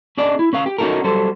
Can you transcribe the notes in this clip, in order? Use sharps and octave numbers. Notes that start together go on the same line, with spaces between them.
C#4 D4 G#4 D5 D#5
E4
C#4 B4 F5
G4
C#4 D#4 E4 F#4 A4 A#4
F#3 G3 A4 C5